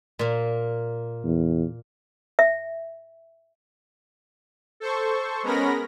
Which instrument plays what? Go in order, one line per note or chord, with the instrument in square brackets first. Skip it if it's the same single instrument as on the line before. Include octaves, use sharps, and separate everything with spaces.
[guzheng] A#2 A#3
[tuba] E2
[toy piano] E5
[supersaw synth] A4 C5 C#6
G#3 B3 C#4 A#4 B5 A#6